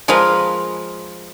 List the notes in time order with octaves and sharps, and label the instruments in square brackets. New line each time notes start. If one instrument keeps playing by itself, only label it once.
[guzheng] F3 G#3 A#4 B4 F5 A#5